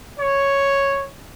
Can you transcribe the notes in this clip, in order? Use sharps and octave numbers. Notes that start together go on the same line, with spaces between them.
C#5